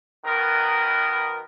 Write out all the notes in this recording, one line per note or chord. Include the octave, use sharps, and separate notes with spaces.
B2 D#3 B3 A#4